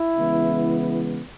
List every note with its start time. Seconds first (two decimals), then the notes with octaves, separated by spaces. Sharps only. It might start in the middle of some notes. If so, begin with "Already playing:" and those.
Already playing: E4
0.17 C#3 E3 G#3 B3